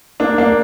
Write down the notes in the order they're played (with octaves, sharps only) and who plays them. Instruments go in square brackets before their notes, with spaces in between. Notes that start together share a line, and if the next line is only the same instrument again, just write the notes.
[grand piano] A#3 D4
A#3 D4